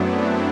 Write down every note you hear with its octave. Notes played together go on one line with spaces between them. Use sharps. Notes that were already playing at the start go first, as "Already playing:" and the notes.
Already playing: F#2 F#3 A3 B3 C4 D4 E4